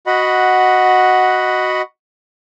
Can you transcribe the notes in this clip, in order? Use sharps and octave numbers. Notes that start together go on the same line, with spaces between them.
F#4 D#5 F#5 B5